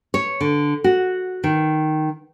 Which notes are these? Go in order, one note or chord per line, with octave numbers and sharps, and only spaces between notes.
C#5
D3
F#4
D#3